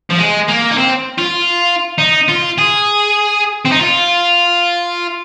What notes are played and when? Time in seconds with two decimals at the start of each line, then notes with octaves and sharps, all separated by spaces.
0.10 F3
0.17 G#3
0.48 A#3
0.71 D#4
0.77 C4
1.18 F4
1.98 D#4
2.28 F4
2.58 G#4
3.65 C4
3.72 D#4
3.79 F4